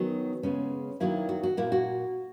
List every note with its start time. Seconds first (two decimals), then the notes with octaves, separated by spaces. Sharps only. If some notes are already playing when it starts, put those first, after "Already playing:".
Already playing: D#3 F#3 B3 C#4
0.43 C#3 G#3 B3 C#4
1.00 D#3 F#3 A#3 E4
1.29 F#4
1.43 F#4
1.57 A#2 A#3 E4
1.72 F#4